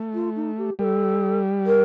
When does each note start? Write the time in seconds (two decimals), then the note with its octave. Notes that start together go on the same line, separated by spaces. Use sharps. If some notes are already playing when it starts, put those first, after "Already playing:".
Already playing: A3
0.14 F4
0.36 D#4
0.58 G4
0.79 G3 A#4
0.84 A4
1.66 A#4